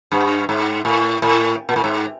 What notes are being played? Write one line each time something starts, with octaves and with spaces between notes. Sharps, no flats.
G2
G#2
A2
A2
A#2
A2
G#2